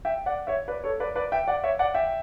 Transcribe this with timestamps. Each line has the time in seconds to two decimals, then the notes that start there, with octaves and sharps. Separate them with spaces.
0.05 E5 G5
0.26 D5 F#5
0.47 C#5 E5
0.68 B4 D5
0.84 A4 C#5
1.00 B4 D5
1.15 B4 D5
1.32 E5 G5
1.47 D5 F#5
1.64 C#5 E5
1.79 D5 F#5
1.95 E5 G5